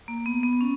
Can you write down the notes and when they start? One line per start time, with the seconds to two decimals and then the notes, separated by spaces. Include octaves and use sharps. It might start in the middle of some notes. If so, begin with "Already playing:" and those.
0.08 A#3
0.26 B3
0.43 B3
0.61 C#4